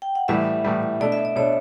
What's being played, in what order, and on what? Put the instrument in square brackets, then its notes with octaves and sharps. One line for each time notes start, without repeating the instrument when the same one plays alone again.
[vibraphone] G5
F#5
[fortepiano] A2 E3 G3 [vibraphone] E5
[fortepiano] A2 E3 G3
[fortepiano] B2 A3 D4 [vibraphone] D5
[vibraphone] E5
D5
[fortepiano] B2 A3 D4 [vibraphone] C#5